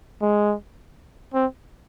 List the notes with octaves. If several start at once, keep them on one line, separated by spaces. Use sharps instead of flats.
G#3
C4